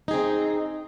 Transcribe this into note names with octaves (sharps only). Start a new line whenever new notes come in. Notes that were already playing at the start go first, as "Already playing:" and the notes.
C4 D#4 G#4